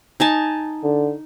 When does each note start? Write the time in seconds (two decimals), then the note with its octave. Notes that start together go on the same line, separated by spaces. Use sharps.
0.20 D#4 G#5 A5
0.83 D3